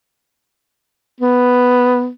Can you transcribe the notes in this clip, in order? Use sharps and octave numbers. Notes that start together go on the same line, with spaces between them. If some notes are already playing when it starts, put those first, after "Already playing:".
B3